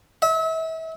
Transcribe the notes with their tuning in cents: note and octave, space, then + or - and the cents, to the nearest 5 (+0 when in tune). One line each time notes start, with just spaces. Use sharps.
E5 -35